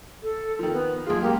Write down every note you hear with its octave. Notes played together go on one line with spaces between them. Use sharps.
A4
D#3 F3 A4
B3
B1 F4 G#4
C#2 A#3 G4